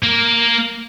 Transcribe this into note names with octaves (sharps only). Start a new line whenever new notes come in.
A#3 A#4